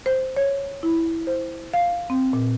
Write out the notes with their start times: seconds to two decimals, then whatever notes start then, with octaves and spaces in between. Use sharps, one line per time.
0.06 C5
0.36 C#5
0.83 E4
1.27 C5
1.73 F5
2.10 C4
2.33 A#2